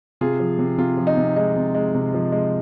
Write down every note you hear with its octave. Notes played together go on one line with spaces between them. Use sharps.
C3 F4 G#4
F3
C3
C3 F4
F3
D#4
C3
G#3 D#4
C3
G#3
C3
F3
G#3